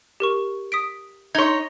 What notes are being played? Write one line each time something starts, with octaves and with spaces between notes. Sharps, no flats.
G4 A#4 C#6
D#6 B6 D7
D#4 C#5 C6 G#6